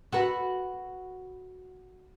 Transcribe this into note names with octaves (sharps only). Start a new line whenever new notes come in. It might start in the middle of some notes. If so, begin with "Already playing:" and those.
F#4 A4 B4